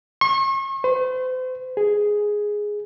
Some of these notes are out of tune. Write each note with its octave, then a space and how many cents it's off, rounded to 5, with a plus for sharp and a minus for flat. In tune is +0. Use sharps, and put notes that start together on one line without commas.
C#6 -40
C5 -40
G#4 +0